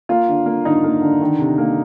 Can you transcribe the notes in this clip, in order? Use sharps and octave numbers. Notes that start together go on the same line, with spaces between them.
A#3 F4
D3
A#3
D3 D#4
A#3
D3
D#3
C3
A#3